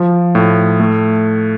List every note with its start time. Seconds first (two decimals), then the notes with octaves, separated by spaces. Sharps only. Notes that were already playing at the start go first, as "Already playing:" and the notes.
Already playing: F3
0.35 A2
0.80 A3